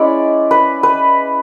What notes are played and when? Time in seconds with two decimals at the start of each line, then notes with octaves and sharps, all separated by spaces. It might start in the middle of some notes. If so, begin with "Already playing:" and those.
Already playing: G#3 C#4 E4 D5
0.51 B4
0.83 B4